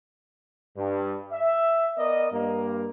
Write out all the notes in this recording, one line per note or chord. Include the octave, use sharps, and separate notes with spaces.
G2
E5
B3 A#4 D5 D#5
G2 A#3